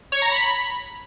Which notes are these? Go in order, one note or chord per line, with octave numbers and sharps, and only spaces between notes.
C#5
A#5
B5